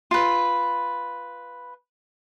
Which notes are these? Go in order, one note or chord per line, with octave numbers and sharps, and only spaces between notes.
F4 B4